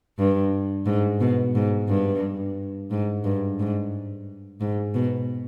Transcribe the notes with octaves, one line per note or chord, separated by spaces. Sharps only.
G2
G#2
B2
G#2
G2
G#2
G2
G#2
G#2
B2